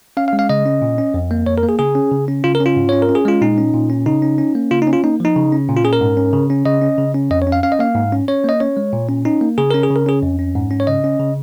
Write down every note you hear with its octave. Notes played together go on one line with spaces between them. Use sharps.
C#4 F5
F5
G#3
F5
C#3 D#5
C#4
A#2
C#4
F2
A#3
F2 C#5
A#4
A#3
G#4
C#3 G#4
C#4
C#3
C#4
C#3 F4
A#4
C#4
F4
G#2
C#4 C#5
A#4
C#4
G#4
G#3 F4
A#2 D#4
C#4
A#2
C#4
C#3 D#4
C#4
C#4
A#3
C#3 F4
D#4
C#4
F4
A#3 D#4
F3 D#4
C#3
C#4
A#2
F4
C#4 G#4
A#4
G#2
C#4
C#3
C#4
C#3 D#5
C#4
C#3
C#4
F2 D#5
C#5
C#4
F5
C#4 F5
D#5
A#3 F5
G#2
C#4
C#4 C#5
A#3 D#5
C#4 C#5
G#3
A#2
C#4
C#4 D#4
A#3
C#3 G#4
C#4 A#4
G#4
C#3
A#4
C#4 G#4
F2
C#4
G#2
C#4
C#5
C#3 D#5
C#4
C#3